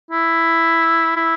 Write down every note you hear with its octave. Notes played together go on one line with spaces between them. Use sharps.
E4
E4